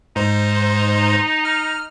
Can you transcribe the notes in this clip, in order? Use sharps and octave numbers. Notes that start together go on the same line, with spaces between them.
G#2 D#4 C5
F6